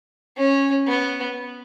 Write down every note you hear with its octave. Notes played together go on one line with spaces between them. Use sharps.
C#4
B3